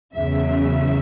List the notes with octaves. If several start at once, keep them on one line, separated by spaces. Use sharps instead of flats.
E2 C#3 F#3 E5
E5